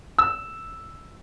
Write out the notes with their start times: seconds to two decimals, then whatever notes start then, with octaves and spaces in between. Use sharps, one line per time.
0.19 E6